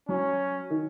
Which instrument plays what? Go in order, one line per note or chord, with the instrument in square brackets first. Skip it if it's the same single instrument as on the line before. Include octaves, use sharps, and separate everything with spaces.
[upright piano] F#3 [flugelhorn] C#4
[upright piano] D#3